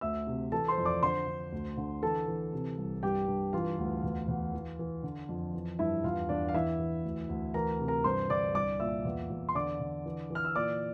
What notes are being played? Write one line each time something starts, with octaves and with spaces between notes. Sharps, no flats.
D2 E5 E6
C3
E3 A4 A5
C5 C6
F2
D5 D6
D3 C5 C6
D3
D2
D3
E3 A4 A5
E3
C3
C2
G2 G4 G5
G2
E3 F4 F5
D2
E2
E2
E3
E3
D3
F2
E3
G2 E4 E5
E2 F4 F5
E2 D4 D5
F5
E3 E4 E5
E3
D2
D2
E3 A#4 A#5
C3
A#4 A#5
G2 C5 C6
D3 D5 D6
C2 D5 D6
A#2 E5 E6
E2
E2
C6
D3 D5 D6
D3
E3
E3 F6
E6
A#2 D5 D6